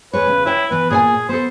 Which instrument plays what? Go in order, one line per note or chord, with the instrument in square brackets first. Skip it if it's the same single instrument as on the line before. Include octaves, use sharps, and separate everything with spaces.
[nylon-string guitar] E2 G#3 C#5 [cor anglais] B4
[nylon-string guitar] E2 C#3
[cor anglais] E4 [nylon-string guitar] C#5 G5
[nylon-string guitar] E3 B3 [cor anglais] B4
[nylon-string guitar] A#2 C#5 G#5 [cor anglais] G#4
[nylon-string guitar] B3 A4 [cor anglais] C5